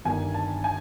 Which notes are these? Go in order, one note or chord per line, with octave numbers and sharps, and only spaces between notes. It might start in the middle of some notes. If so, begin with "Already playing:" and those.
G1 G2 D#3 G#5
A5
G#5